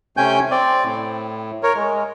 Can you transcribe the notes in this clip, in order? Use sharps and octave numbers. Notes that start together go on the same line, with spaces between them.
C3 A3 C#4 G5 G#5 G6
C4 D5
A2
A#4 C#5
G#3